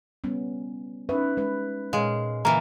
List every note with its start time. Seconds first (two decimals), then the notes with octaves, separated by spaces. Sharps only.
0.24 G3 B3 C#4
1.09 C#4 D#4 B4 E5
1.37 G#3 B4
1.93 A#2 G#3 C#5 F5
2.45 D3 E3 A#3 A#5